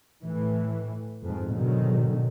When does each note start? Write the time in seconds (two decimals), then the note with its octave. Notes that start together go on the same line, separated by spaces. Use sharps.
0.21 A2 E3
1.22 F2 G#2
1.51 G#2 B2 D3 D#3 F#3